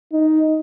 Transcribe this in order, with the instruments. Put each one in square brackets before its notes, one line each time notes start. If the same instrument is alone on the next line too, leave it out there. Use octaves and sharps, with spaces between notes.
[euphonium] D#4